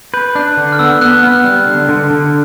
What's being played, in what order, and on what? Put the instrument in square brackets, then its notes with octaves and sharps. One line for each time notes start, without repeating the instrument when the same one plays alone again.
[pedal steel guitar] B4 [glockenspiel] G6
[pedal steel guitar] D4 [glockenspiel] F#6
[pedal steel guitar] D3
[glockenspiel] F6
[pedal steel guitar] B3 [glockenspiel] E6
[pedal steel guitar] B3 [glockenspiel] F#6
[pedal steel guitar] B3 [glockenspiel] F6
[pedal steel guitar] G3
D3
D3
D3